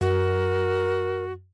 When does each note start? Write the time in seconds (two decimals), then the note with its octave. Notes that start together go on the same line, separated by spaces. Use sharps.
0.01 F#2 F#4 A#4